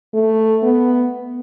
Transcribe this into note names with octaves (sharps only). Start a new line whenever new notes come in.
A3
B3